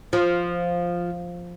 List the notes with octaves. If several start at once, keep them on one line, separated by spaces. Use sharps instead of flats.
F3